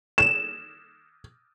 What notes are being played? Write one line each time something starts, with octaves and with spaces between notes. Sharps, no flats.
E7